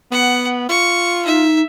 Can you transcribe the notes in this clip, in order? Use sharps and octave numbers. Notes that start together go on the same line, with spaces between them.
B3 F#5
F4 C#6
D#4 E5